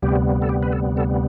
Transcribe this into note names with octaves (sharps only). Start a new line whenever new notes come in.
D2 C3 G3 B3 G4
A4
G4
B4
A4
A4